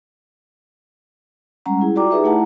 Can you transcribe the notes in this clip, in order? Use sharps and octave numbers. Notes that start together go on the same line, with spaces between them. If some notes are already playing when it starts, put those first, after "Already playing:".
G3 G#3 C#4 F#5 A#5
E4 G#4
F4 F#4 D5 G5 A#5 D6
D#4 G4 G#4 B4 E5 A#5
A3 E4 F#5 A5 A#5